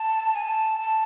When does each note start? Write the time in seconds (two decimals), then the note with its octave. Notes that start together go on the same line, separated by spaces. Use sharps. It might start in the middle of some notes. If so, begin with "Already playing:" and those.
Already playing: A5
0.35 G#5
0.45 A5
0.80 A5